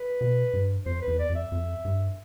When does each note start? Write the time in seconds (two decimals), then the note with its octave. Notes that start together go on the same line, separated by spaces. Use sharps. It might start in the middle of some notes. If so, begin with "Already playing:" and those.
Already playing: B4
0.21 B2
0.53 G2
0.86 F2 C5
1.02 B4
1.08 E2
1.19 D5
1.30 F2
1.35 E5
1.52 F2
1.85 G2